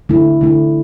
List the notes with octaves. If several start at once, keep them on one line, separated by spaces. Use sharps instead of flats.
D3 A3 E4
D3 A3 E4